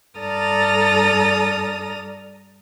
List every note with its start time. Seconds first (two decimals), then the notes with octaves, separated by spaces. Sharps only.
0.18 G2 A4 D5 A#5 D#6 F6